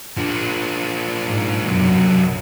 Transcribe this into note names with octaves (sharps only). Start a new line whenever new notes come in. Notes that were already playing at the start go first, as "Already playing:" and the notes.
F3 D4
G#2
B1 F#2 C3 F#3